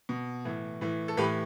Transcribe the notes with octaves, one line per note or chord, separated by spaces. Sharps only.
B2
A2 E3
A2 E3
A4
A2 E3 G4 B4